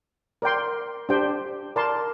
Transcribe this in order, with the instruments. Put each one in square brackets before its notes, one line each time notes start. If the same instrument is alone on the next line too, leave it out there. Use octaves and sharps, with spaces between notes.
[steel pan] A#4 D5 G5 C6
D4 G4 C5 G5
A#4 D5 A5 C6